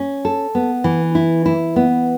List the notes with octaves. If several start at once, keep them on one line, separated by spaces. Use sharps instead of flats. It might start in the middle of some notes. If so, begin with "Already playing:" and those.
Already playing: C#4
A4
B3
E3
E4
E4
B3